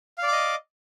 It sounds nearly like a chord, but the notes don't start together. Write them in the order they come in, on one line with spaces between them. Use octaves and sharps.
F5 D5 D6 D#5